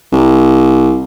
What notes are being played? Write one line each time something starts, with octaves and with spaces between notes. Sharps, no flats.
C2